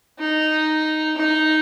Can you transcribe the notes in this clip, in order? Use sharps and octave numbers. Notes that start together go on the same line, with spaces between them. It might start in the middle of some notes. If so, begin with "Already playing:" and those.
D#4
D#4